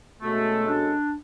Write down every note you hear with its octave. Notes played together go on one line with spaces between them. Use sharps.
B2 G#3 A3 C#4 F#4 A4
D4